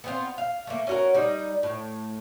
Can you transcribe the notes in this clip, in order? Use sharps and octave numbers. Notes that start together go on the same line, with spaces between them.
B3 C4 F4
F5
A3 A#3
C#4 F#4 A#4
G3 D#4
A2